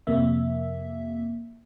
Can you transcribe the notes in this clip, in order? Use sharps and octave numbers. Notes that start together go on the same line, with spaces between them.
F2 C3 A#3 E5